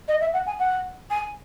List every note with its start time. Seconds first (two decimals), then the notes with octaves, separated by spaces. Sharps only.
0.08 D#5
0.21 E5
0.34 F#5
0.47 G#5
0.59 F#5
1.11 G#5